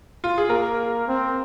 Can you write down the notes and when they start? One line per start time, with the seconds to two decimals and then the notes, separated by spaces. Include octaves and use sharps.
0.24 F4
0.38 G#4
0.50 A#3 A#4
1.08 C4